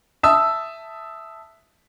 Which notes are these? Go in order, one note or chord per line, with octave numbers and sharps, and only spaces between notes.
E5 A5 D#6 E6